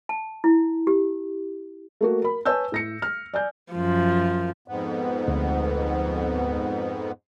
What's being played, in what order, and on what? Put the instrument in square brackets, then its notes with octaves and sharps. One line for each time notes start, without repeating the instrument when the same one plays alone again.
[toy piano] A5
E4
G4
[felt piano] A3 A#3 F#4
A#4 B5
B4 C#5 G#5 A5 E6 G6
A2 A#6 C#7
F6
D5 G#5 G6
[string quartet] F#2 F3
[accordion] F2 G#2 B3
[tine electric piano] D2